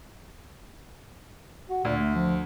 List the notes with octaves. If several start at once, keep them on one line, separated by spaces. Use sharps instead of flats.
F#4
D2 A#2
A3
F3